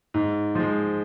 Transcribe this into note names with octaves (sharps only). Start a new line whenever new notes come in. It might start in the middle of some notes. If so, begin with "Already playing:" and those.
G#2
F3 G#3